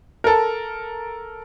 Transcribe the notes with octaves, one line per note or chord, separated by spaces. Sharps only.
A4 A#4